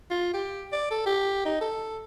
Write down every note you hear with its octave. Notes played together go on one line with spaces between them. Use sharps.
F4
G4
D5
A4
G4
D#4
A4